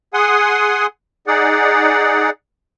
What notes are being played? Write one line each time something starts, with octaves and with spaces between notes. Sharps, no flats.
G#4 F#5 G#5 C6 D#6
D#4 G#4 D5 F#5